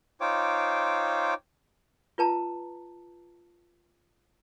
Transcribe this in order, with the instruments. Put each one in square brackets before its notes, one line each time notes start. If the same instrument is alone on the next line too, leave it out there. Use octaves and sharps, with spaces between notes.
[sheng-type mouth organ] D#4 F4 C5 C#5 G5 D6
[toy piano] F4 B4 A5 A#5